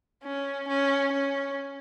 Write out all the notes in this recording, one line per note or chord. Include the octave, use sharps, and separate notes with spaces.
C#4
C#4
C#4